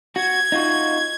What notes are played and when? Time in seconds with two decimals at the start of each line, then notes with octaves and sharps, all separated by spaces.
0.16 F#4 G#6
0.52 D#4 F4 F#4